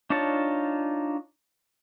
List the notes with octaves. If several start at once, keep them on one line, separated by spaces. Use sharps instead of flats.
D4 D#4 F4 C#5 A5